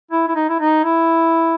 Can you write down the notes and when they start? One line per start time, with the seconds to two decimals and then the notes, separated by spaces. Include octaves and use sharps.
0.11 E4
0.28 E4
0.35 D#4
0.49 E4
0.60 D#4
0.84 E4